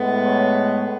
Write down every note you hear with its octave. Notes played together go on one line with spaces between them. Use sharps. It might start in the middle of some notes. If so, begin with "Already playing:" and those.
Already playing: A2 G#3 B3
C#5